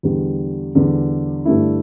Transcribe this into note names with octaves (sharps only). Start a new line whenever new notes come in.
E2 D3 G3
E2 D3 G3
G2 D3 A3 E4